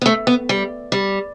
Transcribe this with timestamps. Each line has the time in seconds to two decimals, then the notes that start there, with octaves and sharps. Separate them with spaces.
0.02 B3
0.06 A3
0.27 B3
0.49 G3
0.92 G3